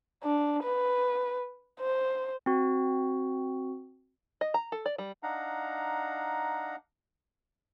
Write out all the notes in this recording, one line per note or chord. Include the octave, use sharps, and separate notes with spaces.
D4
B4
C5
C4 F#4
D#5
A#5
A4
D5
G3
D4 D#4 F5 F#5 A#5